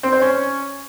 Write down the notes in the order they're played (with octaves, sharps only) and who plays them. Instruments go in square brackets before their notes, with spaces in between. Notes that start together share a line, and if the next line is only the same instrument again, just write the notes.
[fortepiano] C4
C5
C#4